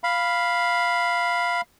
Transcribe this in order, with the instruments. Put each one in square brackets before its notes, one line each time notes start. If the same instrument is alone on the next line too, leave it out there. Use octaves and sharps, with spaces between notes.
[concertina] F5 B5